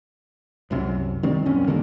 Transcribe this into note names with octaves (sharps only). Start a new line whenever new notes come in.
C2 F#2 C3
D#3 G3 C4
D#1 F#2 C4 C#4
D3 D#3 G3 A#3